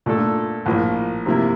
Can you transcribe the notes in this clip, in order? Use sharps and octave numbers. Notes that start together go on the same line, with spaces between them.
A#2 A3 D4 F4 A4
A#1 A2 F3 A#3
C3 F3 A#3 E4